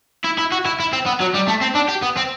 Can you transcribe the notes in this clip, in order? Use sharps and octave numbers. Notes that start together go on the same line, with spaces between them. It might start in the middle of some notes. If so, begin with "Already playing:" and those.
E4
E4
F#4
E4
E4
C4
B3
F#3
G3
A3
C4
D4
G4
B3
C4